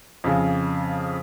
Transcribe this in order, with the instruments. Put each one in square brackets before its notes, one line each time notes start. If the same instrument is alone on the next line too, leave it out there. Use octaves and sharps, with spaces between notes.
[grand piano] F2 C#3